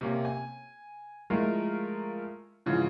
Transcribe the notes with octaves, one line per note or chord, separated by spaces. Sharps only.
C3 A#3 C#4
G#5
F3 G#3 A3 E4 F4 A#4
G#2 C#3 E3 F3